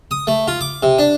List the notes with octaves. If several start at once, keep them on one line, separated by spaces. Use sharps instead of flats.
D#6
A3
F4
D6
C3
D4